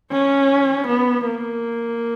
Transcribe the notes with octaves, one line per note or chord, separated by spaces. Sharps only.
C#4
B3
A#3